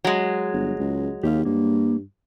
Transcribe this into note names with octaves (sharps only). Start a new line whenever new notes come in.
F#3 G#3
G1
C#2
D#2 G4 F5
G2 A#3